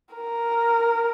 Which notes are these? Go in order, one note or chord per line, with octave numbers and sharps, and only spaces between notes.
A#4